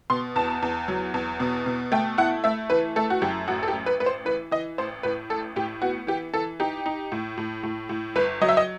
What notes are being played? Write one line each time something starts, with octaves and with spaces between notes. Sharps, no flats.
B2 C6
E2 A5
E2
F#3
E2
B2
B2
A3 G5
E4 F#5
A3 E5
E3 B4
A3 A4
F#4
F#2 G4
A1 F#4
A4
G4
A1
B4
A1 B4
C5
E3 B4
E3 D#5
A1 C5
A2 B4
A1 A4
A2 G4
B3 F#4
E3 G4
E3 A4
D#4 G4
D#4
A2
A2
A2
A2
G1 B4
F#3 D#5
E5
D#5